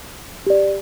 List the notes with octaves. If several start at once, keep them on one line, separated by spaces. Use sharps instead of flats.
G4 D5